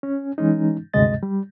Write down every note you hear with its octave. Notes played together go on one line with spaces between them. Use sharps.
C#4
E3 G#3 C#4 D#4
D2 G2 C3 G#3 D#5 A6
G3